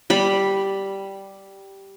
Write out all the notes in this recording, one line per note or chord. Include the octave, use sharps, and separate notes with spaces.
G3 B5